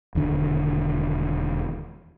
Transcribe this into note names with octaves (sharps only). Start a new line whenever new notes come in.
E1 D#2 D3